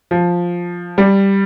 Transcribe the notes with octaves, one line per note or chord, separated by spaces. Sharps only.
F3
G3